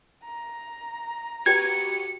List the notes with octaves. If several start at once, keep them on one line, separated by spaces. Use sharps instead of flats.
A#5
F#4 G4 B4 G#6 C#7